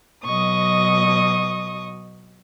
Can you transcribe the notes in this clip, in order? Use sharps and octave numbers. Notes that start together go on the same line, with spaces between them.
B2 F#3 D#5 C#6 D#6